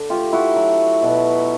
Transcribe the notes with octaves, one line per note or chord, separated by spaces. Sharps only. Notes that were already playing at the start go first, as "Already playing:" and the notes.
Already playing: D3 D4
A3 F4 G4
E4 F#4
F#3
B2